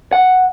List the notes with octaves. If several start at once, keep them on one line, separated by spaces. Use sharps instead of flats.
F#5